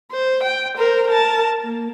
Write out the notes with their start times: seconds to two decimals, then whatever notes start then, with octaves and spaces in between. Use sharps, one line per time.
0.12 C5
0.43 G5
0.77 A#4 C5
1.08 A#4 A5
1.62 A#3